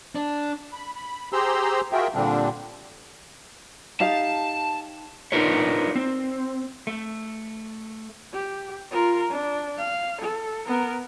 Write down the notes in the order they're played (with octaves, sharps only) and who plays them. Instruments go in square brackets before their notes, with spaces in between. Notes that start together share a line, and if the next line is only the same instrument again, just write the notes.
[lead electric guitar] D4
[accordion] B5
B5
G4 G#4 C5 A#5 C6 E6
F4 F#4 G#4 A#4 E5 G5
A#2 D3 G3 C4 D4
[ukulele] D#4 G4 F5 [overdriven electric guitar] A5
[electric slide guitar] D4 D#4 F4 A#4 B4 C#5
C4
A3
[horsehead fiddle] G4
F4 A#4
D4
F5
A4
B3 A#4